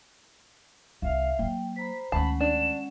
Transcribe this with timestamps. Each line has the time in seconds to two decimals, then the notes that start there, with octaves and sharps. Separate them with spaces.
1.02 C2 D#4 E5 F5
1.39 F#3 A#3 G5
1.77 C5 A#5 B5 B6
2.12 D2 D#3 G#3 C#4 F#5 A5 B5
2.41 D4 E7